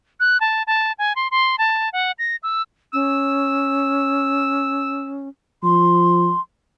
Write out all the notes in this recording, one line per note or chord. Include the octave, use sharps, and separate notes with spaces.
F#6
A5
A5
G#5
C6
C6
A5
F#5
A#6
E6
C#4 E6
F3 C6